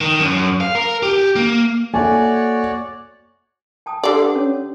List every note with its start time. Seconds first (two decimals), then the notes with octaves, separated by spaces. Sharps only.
0.01 D#3
0.20 F#2
0.61 F5
0.75 A#4
1.03 G4
1.36 A#3
1.94 A#3 F#4 A4 C#5 D5 E5 G#5
3.86 G5 A5 D#6
4.03 D3 G4 D5 D6
4.19 B4 F#5
4.35 C#4 C#5